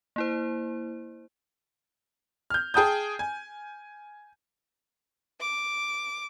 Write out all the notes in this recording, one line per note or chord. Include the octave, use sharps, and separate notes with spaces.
A#3 E4 C5
F6 G6
G#4 G5 A5 D#6 G6
G#5
D6